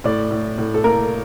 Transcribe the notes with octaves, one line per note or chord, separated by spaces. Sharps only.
A2 D5
A2
A2
A4
A#3 A#4